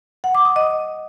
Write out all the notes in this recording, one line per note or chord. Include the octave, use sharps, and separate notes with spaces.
F#5
D6
D#6
D#5